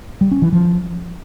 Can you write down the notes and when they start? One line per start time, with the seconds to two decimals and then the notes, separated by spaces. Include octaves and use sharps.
0.21 G3
0.31 C#4
0.42 E3
0.52 F3